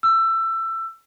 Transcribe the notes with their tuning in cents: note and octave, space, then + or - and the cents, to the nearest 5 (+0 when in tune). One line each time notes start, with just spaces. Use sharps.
E6 +20